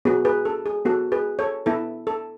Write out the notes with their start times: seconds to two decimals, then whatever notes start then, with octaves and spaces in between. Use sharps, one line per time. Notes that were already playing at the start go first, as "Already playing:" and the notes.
0.05 B3 F#4 G#4
0.25 G#4 B4
0.45 A4
0.66 G#4
0.85 B3 F#4 A4
1.12 G#4 B4
1.39 A4 C#5
1.66 B3 E4 A4
2.07 A4